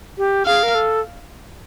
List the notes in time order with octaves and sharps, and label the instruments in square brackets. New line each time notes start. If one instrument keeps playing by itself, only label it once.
[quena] G4
[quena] G#4 [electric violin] F5
[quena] A#4
A4